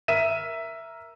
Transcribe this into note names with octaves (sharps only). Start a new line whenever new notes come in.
A#4 E5 D#7 E7